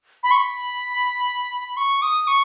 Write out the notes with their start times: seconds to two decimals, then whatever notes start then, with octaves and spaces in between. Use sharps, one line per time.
0.23 B5
0.31 C#6
0.38 B5
1.77 C#6
2.02 D#6
2.27 C#6